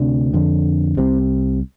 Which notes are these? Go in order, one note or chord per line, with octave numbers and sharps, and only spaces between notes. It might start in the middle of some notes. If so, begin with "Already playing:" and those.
Already playing: D2 C3 D4
F2 D3
C2 C3 C4